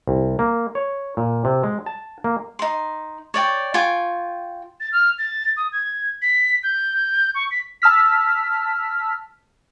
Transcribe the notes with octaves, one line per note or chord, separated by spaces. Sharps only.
C2
A#3
C#5
A#2
C3
G#3
A5
A#3
D#4 C6
C#5 D5 G5
F4 G5 G#5 C#6
A6
F6
A6
D#6
G#6
B6
G6
C#6
B6
A5 E6 F6 B6